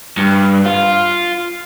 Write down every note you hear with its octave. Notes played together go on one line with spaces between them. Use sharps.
G2
F4